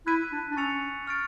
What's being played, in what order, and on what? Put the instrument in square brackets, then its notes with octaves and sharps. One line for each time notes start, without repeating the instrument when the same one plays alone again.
[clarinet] E4 [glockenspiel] F#6 B6 D#7
[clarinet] D4
D4
[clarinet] C#4 [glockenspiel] C#6 E6 A6 C#7 F7
[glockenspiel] C#6 F6 A6 D7